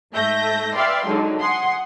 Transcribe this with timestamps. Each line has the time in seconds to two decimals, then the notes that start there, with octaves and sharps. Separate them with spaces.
0.12 G#2 A3 E5 G6 A#6
0.75 B4 D5 E5 F5 G5 C6
1.06 D3 F#3 G#3 D#4
1.41 F#5 G#5 C6 D#6